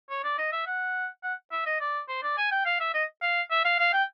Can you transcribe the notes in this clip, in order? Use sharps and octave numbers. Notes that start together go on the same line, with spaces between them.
C#5
D5
D#5
E5
F#5
F#5
E5
D#5
D5
C5
D5
G#5
G5
F5
E5
D#5
F5
E5
F5
F5
G5